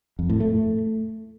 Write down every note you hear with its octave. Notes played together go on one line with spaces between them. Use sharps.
F2
A2
A3